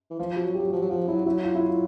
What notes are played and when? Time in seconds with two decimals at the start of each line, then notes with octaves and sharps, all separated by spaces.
0.11 E3
0.19 F3 F4
0.32 F3 F#4
0.45 F#3
0.55 G4
0.59 F#3
0.68 F#4
0.72 F3 G4
0.82 F#3
0.90 F3 F#4
1.08 F#3 E4
1.26 F#3 E4
1.44 F4
1.55 E4
1.61 F4